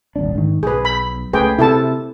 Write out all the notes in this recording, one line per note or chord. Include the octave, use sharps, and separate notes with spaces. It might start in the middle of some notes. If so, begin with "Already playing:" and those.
D#1 G#1 D4
G#2 D#3
B1 G#4 B4
B5
C#2 C#3 A3 G#4 B4 G5
C3 E4 A4 A5